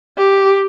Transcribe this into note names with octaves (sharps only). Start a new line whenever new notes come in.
G4